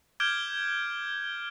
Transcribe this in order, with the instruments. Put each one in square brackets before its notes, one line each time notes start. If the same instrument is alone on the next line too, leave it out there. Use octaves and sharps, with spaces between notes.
[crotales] D6 F6 G6 G#6 D7 G7